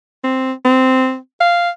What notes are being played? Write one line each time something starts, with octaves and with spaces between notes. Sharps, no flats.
C4
C4
F5